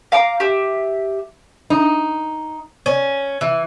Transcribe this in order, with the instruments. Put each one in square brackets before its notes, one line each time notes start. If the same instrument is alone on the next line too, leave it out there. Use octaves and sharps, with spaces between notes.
[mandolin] F5 A#5 D6
G4 E5
[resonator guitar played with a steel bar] D#4
[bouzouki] C#4
E3